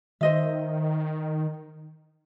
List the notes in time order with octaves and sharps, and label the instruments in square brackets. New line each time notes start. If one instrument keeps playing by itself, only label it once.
[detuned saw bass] D#3 [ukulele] C5 D#5 E5